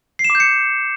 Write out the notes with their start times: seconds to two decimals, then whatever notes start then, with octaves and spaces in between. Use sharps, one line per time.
0.19 C7
0.24 E7
0.30 D6
0.35 G6
0.40 C#7